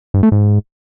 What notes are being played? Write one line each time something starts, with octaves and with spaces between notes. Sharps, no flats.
G2
A3
G#2